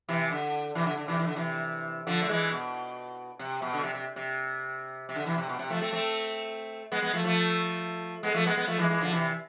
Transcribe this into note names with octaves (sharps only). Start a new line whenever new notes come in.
C3 E3
D3
C3 E3
D3
D3
C3 E3
E3
D3
C3 E3
D3 F3
A3
E3 G#3
B2
C3
B2
D3
C3
C3
C3
C3
D3
C3 E3
C3
B2
C3
F3 A3
A3 C4
A3 C4
G#3 B3
G#3 B3
F3 A3
F3 A3
G#3 B3
F3 A3
G#3 B3
G#3 B3
F3 A3
E3 G#3
E3 G#3
D3 F3
C3 E3